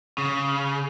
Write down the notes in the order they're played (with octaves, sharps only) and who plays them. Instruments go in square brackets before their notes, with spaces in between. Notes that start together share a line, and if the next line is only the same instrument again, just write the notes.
[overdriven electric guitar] C#3